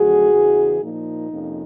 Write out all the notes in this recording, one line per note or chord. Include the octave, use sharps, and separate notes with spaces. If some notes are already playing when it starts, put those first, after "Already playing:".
Already playing: F2 D3 F#3 A3 F#4 G#4
E2 C#3 E3
A#2 F3 A#3 D#4
F2 C3 F3 A#3 C#4